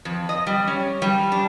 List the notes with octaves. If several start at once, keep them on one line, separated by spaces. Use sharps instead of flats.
F2
D#5
G3
C#4
G3
D4